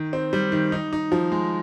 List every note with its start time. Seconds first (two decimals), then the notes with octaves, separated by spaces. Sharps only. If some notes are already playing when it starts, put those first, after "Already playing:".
Already playing: D#3
0.13 C4
0.33 G3
0.52 D#3
0.72 D#4
0.93 D#4
1.12 F3
1.32 G#3